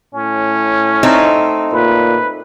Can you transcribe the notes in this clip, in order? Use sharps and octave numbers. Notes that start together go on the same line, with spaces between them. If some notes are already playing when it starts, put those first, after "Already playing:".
A2 C#4
A3 C4 D#4
A#2 B4